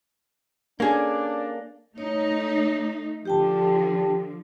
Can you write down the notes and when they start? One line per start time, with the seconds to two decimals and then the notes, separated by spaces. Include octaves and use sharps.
0.80 A#3 C#4 D4 G#4 A4 D5
1.98 A3 D#4 C#5
3.25 D3 F3 G4 G5 A5